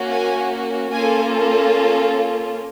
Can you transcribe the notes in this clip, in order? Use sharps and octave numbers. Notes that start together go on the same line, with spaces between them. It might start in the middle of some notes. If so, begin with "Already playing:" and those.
Already playing: A#3 C#4 F#4
G#5
A#3 C#4 F4 A4 G#5